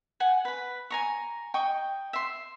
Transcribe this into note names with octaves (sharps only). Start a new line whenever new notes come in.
F#5 G#5
B4 B5
G#5 A#5 C#6
D#5 G5 C#6
E5 C6